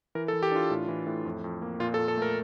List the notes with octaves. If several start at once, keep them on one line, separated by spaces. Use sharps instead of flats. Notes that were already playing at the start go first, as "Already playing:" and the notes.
E3 A#4
A4
E3
G4
D4 F4
A2
E3
A2
F2
F2
A#3
A#2 F4
A4
A#2
A4
A3 A#4